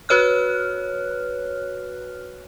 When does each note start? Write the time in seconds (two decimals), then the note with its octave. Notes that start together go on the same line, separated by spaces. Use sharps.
0.09 F#4 B4 C#5 F6 F#6